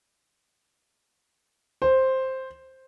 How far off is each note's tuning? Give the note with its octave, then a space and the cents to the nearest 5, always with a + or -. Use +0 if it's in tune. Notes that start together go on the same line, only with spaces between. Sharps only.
C5 +5